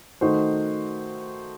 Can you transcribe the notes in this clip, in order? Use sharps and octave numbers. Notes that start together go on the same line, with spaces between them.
D#3 A3 D#4 F#4 C5